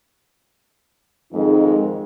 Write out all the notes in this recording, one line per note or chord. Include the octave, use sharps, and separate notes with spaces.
F2 G#2 D#3 G#3 D#4